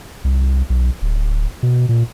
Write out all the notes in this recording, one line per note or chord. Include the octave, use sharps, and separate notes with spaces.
C2
B1
D1
B2
A#2